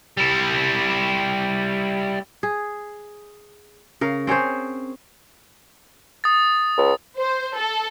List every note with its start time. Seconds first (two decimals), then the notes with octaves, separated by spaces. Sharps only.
0.17 G3 E4
2.43 G#4
4.01 C#3 A#4 F5
4.27 C4 C#4 G#4 C5
6.24 D#6 A6
6.78 C#2
7.16 C5
7.56 A4